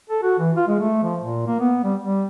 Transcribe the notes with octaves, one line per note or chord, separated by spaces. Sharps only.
A4
F#4
E3
F4
G#3
A3
F3
A#2
A#3
B3
G3
G3